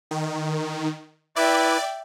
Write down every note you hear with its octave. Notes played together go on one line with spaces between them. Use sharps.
D#3
E4 B4 D5 E5 G5